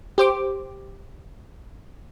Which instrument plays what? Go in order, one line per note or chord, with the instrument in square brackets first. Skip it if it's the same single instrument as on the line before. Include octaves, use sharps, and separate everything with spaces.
[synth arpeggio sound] G4 C5 D6